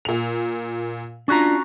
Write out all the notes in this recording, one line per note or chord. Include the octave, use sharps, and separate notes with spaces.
A#2 F7
C#4 D4 F4 F#4 A#5